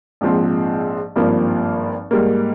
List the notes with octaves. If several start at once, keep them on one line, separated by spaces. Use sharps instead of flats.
A#1 G#2 F3 C4
G#1 G2 F3 A#3
G#2 G3 A#3